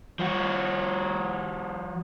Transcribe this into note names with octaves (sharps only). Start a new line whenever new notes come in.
F3 F#4